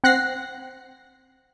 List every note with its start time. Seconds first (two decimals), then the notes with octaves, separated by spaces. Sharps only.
0.04 C4 F#5 F#6 A#6 C7